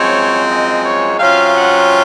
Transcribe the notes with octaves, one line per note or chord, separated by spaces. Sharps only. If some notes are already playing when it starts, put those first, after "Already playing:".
Already playing: F#2 F3 G#3 C4 C#5
D#5
C#5
C3 F#3 C#4 F4 F5
F#5